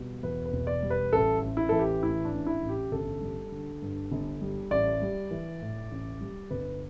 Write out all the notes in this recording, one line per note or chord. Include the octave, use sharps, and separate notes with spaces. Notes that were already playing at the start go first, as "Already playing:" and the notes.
Already playing: B2 G3
E2 B4
B4
E1
D5
G3
B4
A1 A4
A1
E4
E3 A4
G4
A2 E4
D4
A1
E4
A1
G4
G1 A4
G3
D3
G2
G1
G3
A1 D5
G3
E3
A2
A1
G3
G1 B4